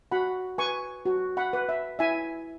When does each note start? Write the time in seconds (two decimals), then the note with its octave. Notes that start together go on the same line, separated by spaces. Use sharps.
0.11 F#4 F#5 B5
0.58 B4 G#5 C#6
1.06 F#4
1.37 F#5 B5
1.53 B4
1.69 E5
1.99 E4 E5 G#5